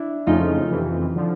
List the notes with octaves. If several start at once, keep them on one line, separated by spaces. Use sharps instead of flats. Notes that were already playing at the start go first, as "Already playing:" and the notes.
Already playing: D4 E4
F2 C#3 F3 A3 C#4 D#4 F4
F2 C3 E3
D3 F3